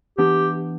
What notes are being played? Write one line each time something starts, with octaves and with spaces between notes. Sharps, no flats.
E3 B3 D4 G4